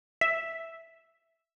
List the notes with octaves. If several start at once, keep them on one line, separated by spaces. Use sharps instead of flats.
E5